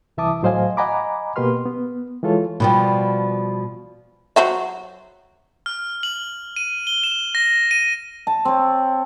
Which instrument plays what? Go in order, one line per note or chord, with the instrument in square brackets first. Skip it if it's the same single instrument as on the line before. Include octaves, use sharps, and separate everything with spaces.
[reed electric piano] C2 E3 E5 A5 D6 D#6
A2 F#3 C5 D#5 F5 G#5
D#5 F#5 G#5 A#5 B5 D6
B2 A#3 G4 B4 C6 F6
B3
E3 G#3 F4 A4 C#5
[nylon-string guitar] B2 F3 G3
[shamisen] F#3 C5 E5
[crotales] F6
F#7
D#7
G7
E7
A#6
D#7
[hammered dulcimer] A5
C4 C#5